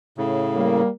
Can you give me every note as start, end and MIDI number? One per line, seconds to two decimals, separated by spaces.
0.18 0.82 45
0.18 0.82 49
0.56 0.88 55
0.56 0.88 58